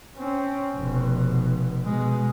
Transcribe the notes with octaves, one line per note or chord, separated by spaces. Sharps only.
C4 C#4
F1 B2
B2 G#3